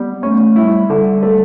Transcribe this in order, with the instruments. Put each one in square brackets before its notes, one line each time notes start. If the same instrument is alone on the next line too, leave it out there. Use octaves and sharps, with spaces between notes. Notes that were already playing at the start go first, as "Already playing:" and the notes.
Already playing: [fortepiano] G3 [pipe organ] B3
[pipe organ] A3 [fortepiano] C#4
[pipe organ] G3 [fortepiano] E4
[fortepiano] D3 [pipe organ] G3
[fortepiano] A3